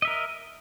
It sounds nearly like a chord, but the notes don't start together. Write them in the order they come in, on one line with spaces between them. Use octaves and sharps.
D#5 E5 A#4